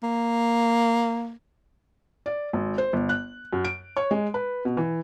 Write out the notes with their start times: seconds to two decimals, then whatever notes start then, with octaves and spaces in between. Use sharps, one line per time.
0.03 A#3
2.26 D5
2.53 G#1
2.78 C5
2.93 G1
3.09 F#6
3.53 F#2
3.65 D7
3.97 C#5
4.11 G#3
4.34 B4
4.65 B2
4.77 E3